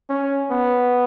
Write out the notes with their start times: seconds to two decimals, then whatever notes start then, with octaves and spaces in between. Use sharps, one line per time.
0.10 C#4
0.51 B3